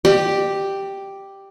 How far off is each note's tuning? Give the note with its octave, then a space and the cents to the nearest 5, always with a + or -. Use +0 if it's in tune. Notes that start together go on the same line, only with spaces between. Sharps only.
G4 +0 D5 +45